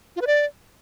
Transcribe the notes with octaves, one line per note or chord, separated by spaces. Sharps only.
F4
B4
D5